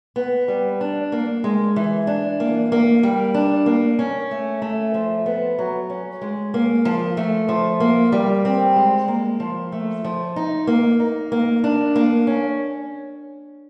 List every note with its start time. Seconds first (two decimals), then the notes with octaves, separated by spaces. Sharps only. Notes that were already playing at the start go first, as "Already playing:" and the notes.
0.16 B3
0.48 G3
0.81 D4
1.12 A#3
1.44 G#3
1.76 E3
2.07 D4
2.40 A#3
2.72 A#3
3.03 G3
3.34 D4
3.66 A#3
3.99 C#4
4.31 A3
4.62 A3
4.94 F3
5.26 B3
5.59 F#3
5.90 C#4
6.21 G#3
6.54 A#3
6.85 F3
7.17 A3
7.49 F3
7.80 A#3
8.12 G3
8.45 C4
8.76 G#3
9.08 A#3
9.40 F3
9.72 A3
10.04 F3
10.36 D#4
10.67 A#3
11.00 D#4
11.32 A#3
11.64 D4
11.96 A#3
12.27 C#4